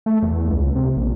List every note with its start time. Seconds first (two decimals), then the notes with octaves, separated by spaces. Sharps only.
0.06 A3
0.23 E2
0.51 C#2
0.75 C3
0.97 A#1